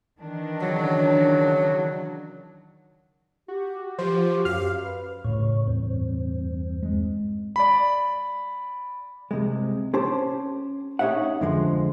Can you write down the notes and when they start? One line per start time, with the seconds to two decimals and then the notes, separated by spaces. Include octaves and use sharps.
0.20 D#3 E3 D4
0.61 C#3 F#3
3.48 F#4 G4
3.99 F3 G4 C5
4.45 F#2 F5 F6
4.84 B4
5.24 A2 C#3 C#5
5.67 E2 G2 C4
6.83 G#3
7.56 D5 B5
9.31 C2 C3 G#3
9.94 C#4 G4 C5 A5
10.99 C#4 D#4 G4 E5 F#5
11.41 F2 D3 F3 G#3